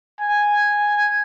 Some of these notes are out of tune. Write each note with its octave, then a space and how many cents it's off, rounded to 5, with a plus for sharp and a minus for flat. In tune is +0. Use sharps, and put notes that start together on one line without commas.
G#5 -5